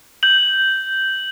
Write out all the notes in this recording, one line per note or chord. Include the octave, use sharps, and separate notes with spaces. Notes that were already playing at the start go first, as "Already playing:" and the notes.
G6 F#7